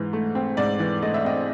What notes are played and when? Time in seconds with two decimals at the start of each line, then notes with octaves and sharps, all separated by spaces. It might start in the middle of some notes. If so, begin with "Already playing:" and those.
Already playing: G#2 E3
0.13 A3
0.35 C4
0.57 G#2 D5
0.80 E3
1.02 A3 D#5
1.14 E5
1.25 C4 D#5